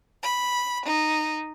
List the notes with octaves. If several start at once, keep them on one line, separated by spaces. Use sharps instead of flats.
B5
D#4